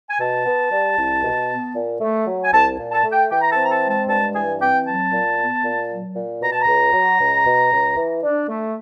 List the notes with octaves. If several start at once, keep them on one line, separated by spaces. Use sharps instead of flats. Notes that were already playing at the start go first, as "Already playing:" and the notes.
G#5
B2 A5
B3
G3
C2
B2
B3
A#2
A3
F#3
G#5
C2 A5
A#2
A5
A3
G5
E3 G5
A#5
A5
C4
A#5
A5
G#3
A5
G2 A5
E3 G#5
C4 G5
F#3 A5
A#2
B3
A#2
F#3
A#2
B2 A#5
A5
C#2 A#5
F#3
C#2
B2
C#2
E3
D4
A3